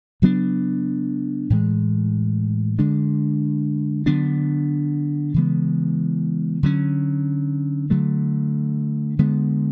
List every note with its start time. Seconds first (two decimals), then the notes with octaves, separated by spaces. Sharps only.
0.22 C#3 F#3 B3 D4
1.50 A2 E3 G#3
2.79 D3 G#3 D4
4.06 D3 F#3 B3 D4
5.34 C#3 E3 G#3 B3
6.63 D3 F#3 C#4
7.90 D3 F#3 A3
9.19 D3 G#3 B3